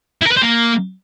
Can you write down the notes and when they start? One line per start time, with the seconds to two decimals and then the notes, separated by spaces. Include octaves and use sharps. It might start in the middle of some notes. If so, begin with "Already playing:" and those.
0.22 E4
0.27 A#4
0.32 B4
0.37 C5
0.42 A#3